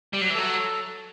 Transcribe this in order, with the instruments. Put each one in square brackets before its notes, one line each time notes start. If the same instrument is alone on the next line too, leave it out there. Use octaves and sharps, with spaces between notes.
[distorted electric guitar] G3
F#3
E3
[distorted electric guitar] F#3 [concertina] A4